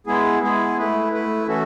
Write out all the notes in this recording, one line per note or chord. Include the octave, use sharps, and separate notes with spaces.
G#3 B3 E4 G#4
G#3 B3 E4 G#4
A3 E4 B4
A3 E4 B4
E3 A3 C#4 F#4 A4